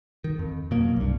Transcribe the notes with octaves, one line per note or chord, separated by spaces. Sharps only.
D#3
F2
B2 F#3 A#3
C2 G2